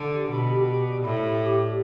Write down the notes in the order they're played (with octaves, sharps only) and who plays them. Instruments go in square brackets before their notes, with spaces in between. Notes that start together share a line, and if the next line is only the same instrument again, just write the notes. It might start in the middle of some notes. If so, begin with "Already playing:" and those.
Already playing: [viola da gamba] D3
[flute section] G4
[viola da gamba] B2 [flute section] B5
[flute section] G4
G4
D5
[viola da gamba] A2 [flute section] B5
[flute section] G4
G4
D5